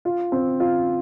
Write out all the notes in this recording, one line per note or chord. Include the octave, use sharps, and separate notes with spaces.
F4
C4
F4